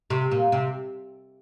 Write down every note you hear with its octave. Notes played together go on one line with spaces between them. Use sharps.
C3
A#2
C3